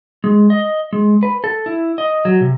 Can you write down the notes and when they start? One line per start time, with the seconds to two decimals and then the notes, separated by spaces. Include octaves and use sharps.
0.24 G#3
0.50 D#5
0.93 G#3
1.23 B4
1.44 A4
1.66 E4
1.98 D#5
2.25 F#3
2.41 C3